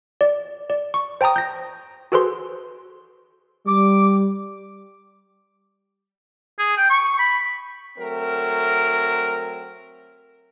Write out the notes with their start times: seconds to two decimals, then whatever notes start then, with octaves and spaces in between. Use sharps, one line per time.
0.21 D5
0.70 D5
0.94 C#6
1.21 C5 G5 A5 A#5 D#6
1.36 G6 A#6
2.12 F#4 G#4 A4 B4 C5 C6
3.66 G3 D6
6.59 G#4
6.77 G5
6.90 C#6
7.19 B5
7.98 F#3 A3 C4 A#4